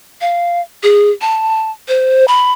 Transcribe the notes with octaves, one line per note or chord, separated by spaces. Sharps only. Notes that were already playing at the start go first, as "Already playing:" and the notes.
F5
G#4
A5
C5
B5